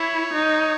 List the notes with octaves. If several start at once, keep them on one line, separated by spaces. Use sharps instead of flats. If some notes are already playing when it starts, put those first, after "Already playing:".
Already playing: E4 C#5
D#4